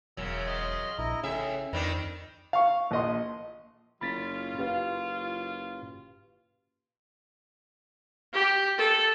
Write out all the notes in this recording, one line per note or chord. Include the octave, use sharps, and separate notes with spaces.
E1 F#2 C#3 E6
D#5 C6
A#1 E4 D#5 A#5
A2 C#3 G#4 E5
F2 D#3 C4 D4 B4
F5 C#6
A#1 D#5 C6
F#1 F#3 F4 B5 A6 B6
F#1 G4 B4 F5
G4
A4